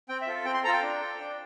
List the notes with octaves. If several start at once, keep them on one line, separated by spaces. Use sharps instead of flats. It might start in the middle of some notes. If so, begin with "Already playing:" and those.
C4 G5
E5
F4 A4
C4 G5
C6
F4 A4 A#5
G5
D4
A4
D4